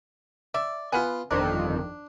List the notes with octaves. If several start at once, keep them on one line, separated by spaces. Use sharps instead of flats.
D5 E5
B3 F4 B4 F#5 G#5
G1 F2 D#3 D4 A#4